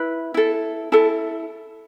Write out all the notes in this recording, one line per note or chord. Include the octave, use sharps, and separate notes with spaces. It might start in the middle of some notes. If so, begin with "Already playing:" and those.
Already playing: E4 B4
E4 A4
E4 A4 A5